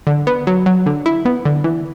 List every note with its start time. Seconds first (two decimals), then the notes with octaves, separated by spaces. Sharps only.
0.07 D3
0.27 B3
0.47 F#3
0.66 F#3
0.86 D3
1.06 E4
1.25 B3
1.45 D3
1.64 E3